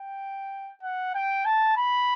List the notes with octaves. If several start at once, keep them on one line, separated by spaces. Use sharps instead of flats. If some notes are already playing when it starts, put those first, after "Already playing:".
Already playing: G5
F#5
G5
A5
B5